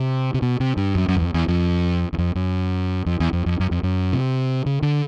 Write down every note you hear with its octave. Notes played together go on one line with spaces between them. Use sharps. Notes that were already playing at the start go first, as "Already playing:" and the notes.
Already playing: C3
C3
B2
C3
G2
F#2
F#2
E2
F2
E2
F2
E2
F2
F#2
F2
E2
F2
F2
F#2
F2
F#2
C3
C#3
D3